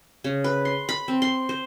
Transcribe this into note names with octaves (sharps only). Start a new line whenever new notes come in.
C#3
B4
C6
B5
C4
C6
C5